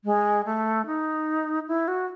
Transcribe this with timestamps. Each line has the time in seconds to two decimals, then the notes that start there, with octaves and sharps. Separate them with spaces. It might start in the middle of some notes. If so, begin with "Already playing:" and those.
0.05 G#3
0.45 A3
0.86 D#4
1.68 E4
1.88 F#4